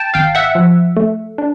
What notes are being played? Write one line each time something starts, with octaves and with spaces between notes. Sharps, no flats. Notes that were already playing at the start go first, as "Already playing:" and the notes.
Already playing: G5 A5
G#1 F5 G5
E5 F#5
F3
A3
D4